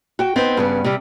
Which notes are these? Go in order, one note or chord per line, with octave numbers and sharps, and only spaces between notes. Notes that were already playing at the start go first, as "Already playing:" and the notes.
F#4 G5
B3 C4 D#4
G2 C#3 B3
C3 G3